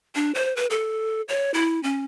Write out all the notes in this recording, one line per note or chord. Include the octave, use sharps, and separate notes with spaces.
D4
C5
B4
A4
C#5
E4
C#4